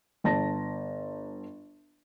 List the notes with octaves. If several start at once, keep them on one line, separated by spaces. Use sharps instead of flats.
G1 A5 A#6